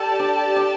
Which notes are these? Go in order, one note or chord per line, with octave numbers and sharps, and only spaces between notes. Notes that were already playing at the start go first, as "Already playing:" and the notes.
Already playing: G4 A4 D5 A5
D4
D4